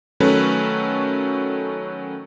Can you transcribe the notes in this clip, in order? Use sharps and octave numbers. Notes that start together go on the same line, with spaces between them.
D#3 F#3 A3 C#4 A4 B4